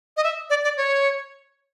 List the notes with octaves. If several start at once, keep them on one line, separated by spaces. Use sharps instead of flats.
D#5
E5
D5
D5
C#5